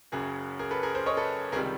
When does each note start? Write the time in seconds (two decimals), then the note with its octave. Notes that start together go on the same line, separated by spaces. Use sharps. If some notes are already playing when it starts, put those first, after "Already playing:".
0.12 F#1 F#2 C#3 F#3 G#4
0.59 G#4 A#4
0.71 A4 B4
0.83 G#4 A#4
0.95 A#4 C5
1.06 C#5 D#5
1.17 A4 B4
1.52 C#2 C3 D#3 G3 G#4 A#4